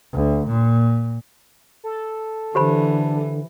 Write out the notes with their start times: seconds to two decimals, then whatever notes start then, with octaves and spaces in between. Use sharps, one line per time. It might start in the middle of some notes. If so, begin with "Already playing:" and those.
0.13 D2
0.47 A#2
1.84 A4
2.55 D3 E3 G4 C5 B5